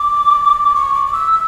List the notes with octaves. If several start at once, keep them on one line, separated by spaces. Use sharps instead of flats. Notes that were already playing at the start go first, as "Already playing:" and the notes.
Already playing: D6
C#6
D6
D6
E6
E6